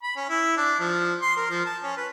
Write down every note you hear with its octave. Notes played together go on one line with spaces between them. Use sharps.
B5
C#4
E4
D4
F3
C6
A#4
F3
A5
C#4
B4